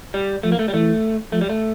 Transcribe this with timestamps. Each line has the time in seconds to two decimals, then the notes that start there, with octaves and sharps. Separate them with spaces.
0.14 G3
0.43 F3 A3
0.52 A#3
0.59 A3
0.68 G3
0.73 E3 A3
1.32 F3 A3
1.41 G3
1.49 A3